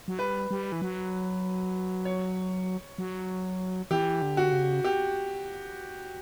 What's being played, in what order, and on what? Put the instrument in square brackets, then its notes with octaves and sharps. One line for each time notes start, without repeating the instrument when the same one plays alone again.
[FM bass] F#3
[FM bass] G3 [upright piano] B4
[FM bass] G3
E3
F#3
[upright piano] C#5
[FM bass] F#3
[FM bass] E3 [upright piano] G4
[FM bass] D3
[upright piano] F#4
[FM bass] C#3
[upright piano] G4